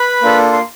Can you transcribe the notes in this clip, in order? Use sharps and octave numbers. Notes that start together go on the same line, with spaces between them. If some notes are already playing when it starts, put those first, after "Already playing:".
Already playing: B4 B5
A#3 D4 F4 A4
C6